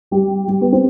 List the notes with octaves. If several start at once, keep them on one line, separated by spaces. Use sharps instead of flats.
G3 G4
G3
B3
C4